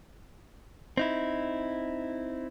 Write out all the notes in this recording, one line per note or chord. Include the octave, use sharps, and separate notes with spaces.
C4 D#4 E4